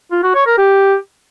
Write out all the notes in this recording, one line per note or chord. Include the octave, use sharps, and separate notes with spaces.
F4
F#4
C#5
A#4
G4